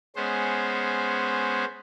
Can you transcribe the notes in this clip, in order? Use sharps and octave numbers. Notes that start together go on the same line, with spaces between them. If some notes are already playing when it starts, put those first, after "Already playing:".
G#3 B3 C#4 C5